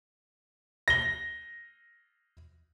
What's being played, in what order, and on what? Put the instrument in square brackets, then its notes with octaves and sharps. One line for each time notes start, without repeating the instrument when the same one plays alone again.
[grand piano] A#6 G7